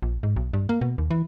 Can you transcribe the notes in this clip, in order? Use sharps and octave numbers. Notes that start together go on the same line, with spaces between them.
A#1
G#2
B1
G2
A#3
B2
D#2
E3